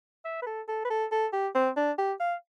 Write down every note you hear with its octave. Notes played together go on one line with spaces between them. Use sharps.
E5
B4
A4
A4
B4
A4
A4
G4
C4
D4
G4
F5